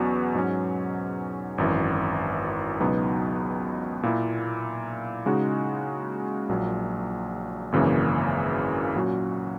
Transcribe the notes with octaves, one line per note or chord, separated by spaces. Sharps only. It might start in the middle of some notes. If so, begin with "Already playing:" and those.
Already playing: E2 B2 F#3 C#4 F#4
G#2 F#3 C#4
G#1 F#2 E3
C#2 B2 F#3 B3 D#4
A#2 A#3 E4
C#3 G#3 D#4 F#4
A#1 A#2 F#3
G#1 F#2 C#3 E3 A#3
A#2 F#3 C#4 F#4